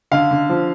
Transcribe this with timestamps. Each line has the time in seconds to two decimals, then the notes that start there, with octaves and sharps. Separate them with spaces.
0.11 D3 F5
0.31 D3
0.49 F3